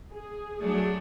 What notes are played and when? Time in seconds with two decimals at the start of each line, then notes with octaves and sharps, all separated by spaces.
0.13 G#4
0.61 F#3 A3 D4